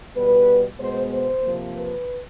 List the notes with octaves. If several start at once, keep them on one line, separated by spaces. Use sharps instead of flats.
B2 G3 B3 B4
B2 G#3 B3 C5
C5
C3 F3 A#3
B4